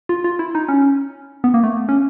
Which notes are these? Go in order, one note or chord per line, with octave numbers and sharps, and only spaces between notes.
F4
F4
E4
D#4
C#4
B3
A#3
A3
C#4